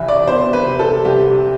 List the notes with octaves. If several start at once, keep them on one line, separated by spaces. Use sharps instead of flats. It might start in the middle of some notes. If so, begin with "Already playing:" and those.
Already playing: C2 C3 E3 E5
D5
B3 C5
B4
C3
A4
C2 G4